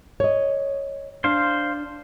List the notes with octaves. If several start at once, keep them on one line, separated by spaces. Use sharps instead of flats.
C#5 D#5
D4 C5 F5